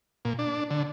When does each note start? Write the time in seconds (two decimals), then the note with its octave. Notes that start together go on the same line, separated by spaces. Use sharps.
0.25 A#2
0.39 D4
0.71 D3